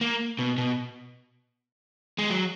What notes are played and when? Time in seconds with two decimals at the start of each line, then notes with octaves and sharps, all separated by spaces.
0.01 A#3
0.39 B2
0.58 B2
2.18 G#3
2.30 F#3